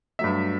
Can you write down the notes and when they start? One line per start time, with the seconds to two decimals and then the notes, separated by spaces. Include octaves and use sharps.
0.19 G2 F#3 A3 E5